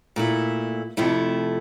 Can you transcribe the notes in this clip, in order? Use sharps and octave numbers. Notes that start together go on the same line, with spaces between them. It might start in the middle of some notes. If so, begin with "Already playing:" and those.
A#2 A3 E4
F2 C3 F3 A3 E4